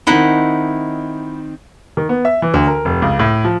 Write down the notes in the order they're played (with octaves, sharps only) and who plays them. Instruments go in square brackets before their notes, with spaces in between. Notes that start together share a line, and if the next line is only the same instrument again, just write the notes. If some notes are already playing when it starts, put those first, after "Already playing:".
[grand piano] D#3 C4 [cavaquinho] D#4 E4 F#5
[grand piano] D#3
B3
E5
E3
D2
A#4
F1
C#2
A2
F3